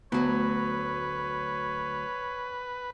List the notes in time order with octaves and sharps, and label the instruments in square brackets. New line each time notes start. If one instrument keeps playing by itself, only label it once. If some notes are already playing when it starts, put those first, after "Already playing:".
[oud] D2 F#3 [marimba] B3 [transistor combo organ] B4 [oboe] C#5